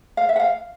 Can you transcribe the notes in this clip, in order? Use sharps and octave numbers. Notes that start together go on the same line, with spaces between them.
F5
E5
F#5
F5